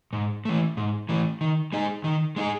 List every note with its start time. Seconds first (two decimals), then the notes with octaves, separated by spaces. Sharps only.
0.13 G#2
0.45 E3 A3
0.77 G#2
1.09 E3 A3
1.41 D#3
1.73 G#3 D#4 G#4
2.04 D#3
2.36 G#3 D#4 G#4